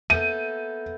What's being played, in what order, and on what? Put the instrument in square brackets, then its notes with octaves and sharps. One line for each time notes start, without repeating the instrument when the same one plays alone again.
[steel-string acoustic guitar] A#3 B3 A4 [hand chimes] E5 G6 [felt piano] D#7